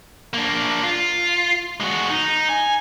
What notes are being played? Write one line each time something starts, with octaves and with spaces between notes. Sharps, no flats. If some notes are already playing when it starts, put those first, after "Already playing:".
A#3 D4
F4
G#3 F#4
D#4
G#5